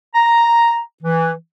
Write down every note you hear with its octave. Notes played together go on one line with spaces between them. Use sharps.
A#5
E3